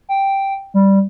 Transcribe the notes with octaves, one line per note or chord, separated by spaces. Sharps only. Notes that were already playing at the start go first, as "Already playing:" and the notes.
G5
G3